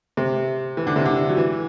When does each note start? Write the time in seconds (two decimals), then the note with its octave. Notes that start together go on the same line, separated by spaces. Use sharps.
0.17 C3
0.77 E3
0.87 D3
0.96 C3
1.05 D3
1.29 F#3
1.37 E3